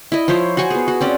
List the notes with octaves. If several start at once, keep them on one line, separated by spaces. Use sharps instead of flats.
E4 D#5
F3 E4 C5 C#5
F#4 C5 G#5 C#6
B3 G#4
F#4
C4 C#4 D5